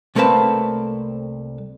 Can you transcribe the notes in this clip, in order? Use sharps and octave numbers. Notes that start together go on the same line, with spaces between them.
C2 A3 A#3 C4 B4 A5